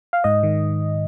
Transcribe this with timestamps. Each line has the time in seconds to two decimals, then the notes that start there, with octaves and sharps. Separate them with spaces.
0.13 F5
0.24 G#2 D#5
0.43 D#3